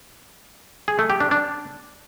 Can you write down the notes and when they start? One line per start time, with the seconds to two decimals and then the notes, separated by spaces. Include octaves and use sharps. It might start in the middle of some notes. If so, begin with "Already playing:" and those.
0.88 G#4
0.99 A3
1.10 G4
1.20 D4
1.31 D4